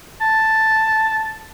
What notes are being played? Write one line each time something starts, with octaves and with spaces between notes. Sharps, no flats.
A5